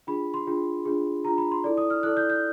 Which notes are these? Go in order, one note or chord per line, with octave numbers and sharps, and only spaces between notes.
D4 F4 G#4 B5
C6
D4 F4 G#4
D4 F4 G#4
D4 F4 G#4 A#5
B5
C6
E4 A4 D5
D#6
F6
E4 A4 D5 F#6
G6
G6